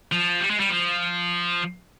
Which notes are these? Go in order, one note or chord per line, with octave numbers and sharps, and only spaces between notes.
F3
G3
G#3
G3
F3